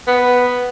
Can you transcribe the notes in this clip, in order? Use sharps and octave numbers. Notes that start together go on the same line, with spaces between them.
B3